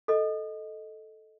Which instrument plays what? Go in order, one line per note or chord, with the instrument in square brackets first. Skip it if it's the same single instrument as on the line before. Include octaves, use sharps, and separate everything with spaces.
[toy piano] A4 D#5